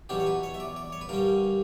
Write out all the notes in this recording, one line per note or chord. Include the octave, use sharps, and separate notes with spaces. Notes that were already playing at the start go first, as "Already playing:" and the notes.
E2 B2 F#3 C#4 G4
C#5
B4
C#5
E5
D5
D5
C#5
B4
G2 D3 G3 C#4 A#4